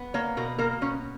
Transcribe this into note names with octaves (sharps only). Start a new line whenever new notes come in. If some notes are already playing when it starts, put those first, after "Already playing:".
Already playing: B3
A#3 C#5
B2 A#4
A#3 A#4
B2 C#4